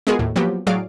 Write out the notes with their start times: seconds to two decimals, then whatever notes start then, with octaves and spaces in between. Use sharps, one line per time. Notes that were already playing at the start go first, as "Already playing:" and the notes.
0.07 G#3 B3 F4 F#4 G#4 A#4
0.19 D#2 A2
0.36 F3 F#3 A#3 B3 G4
0.67 A2 F#3 G#4 D5 F5 D7